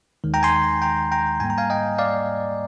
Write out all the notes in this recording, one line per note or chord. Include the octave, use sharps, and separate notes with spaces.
D#2 D#3 G#3
G5 A#5
G#5 C6
G5 A#5
G5 A#5
G#2 G3 A#3 G#5
A#5
F5 G#5
D#5 G5
D5 F5